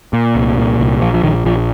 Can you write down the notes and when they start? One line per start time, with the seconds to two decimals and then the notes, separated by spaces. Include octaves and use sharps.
0.13 A#2
0.35 C2
0.57 A#2
0.80 C2
1.01 A#1 F3
1.14 F3
1.23 A#1 D#3
1.45 A#1 F3